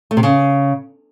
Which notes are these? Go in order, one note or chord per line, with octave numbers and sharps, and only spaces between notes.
A3
C3
C#3